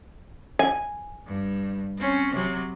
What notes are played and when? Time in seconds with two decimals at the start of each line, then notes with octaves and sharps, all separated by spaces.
0.59 G#5
1.27 G2
1.98 C4 C#4
2.33 C3 F#3